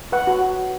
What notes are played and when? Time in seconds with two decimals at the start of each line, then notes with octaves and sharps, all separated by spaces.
0.12 B4 F#5
0.27 F#4